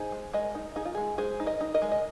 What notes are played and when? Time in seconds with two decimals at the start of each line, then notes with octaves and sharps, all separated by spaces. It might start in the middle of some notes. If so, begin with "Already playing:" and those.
Already playing: D#4 G#4 C5
0.12 G#3
0.33 G#3 A#4 D#5
0.55 D#4
0.76 D#4 G#4
0.85 F4
0.95 G#3 G#4
1.18 G#3 G#4 C5
1.40 D#4
1.46 A#4 D#5
1.61 D#4
1.74 A#4 D#5
1.82 G#3
1.92 D#5